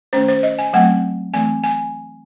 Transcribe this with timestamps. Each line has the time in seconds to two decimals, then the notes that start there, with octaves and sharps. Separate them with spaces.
0.13 D#3 A3 C#4 C5
0.28 C5
0.43 D#5
0.59 G#5
0.73 F#3 A3 C4 F#5
1.34 E3 A3 C4 G#5
1.64 G#5